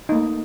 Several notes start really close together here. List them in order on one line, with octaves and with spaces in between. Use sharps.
D#4 A#3 A3